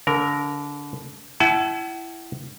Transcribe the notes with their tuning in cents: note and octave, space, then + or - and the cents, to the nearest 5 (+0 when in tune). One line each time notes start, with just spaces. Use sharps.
D3 -30 A#4 +0
E4 +15 F#5 +40 A5 -35